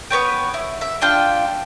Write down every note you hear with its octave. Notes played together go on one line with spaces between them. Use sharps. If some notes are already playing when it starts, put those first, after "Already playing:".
B3 B4 C#5 G5
E4
E5
D4 F4 G5